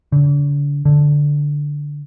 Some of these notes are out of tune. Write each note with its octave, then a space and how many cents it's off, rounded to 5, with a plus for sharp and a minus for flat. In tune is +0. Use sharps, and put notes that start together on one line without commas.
D3 -40
D3 -5